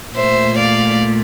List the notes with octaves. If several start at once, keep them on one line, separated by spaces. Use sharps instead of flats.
A#2 A3 C5 E5
D5 F5